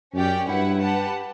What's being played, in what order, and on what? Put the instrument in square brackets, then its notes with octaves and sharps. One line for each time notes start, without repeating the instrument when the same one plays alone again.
[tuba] F#2 [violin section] C#4 G4 D5 G5
[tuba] G2 [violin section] E4 B4 F#5
[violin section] G4 B4 F#5 A5